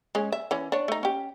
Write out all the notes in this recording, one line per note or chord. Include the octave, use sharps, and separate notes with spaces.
G#3 C#4
E5
E3 C#4
D4 C#5
A3 D#4
C#4 G4